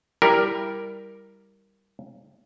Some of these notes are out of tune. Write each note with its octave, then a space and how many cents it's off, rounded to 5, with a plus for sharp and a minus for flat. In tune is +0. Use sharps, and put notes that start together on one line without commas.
G3 +0 E4 +15 A#4 +0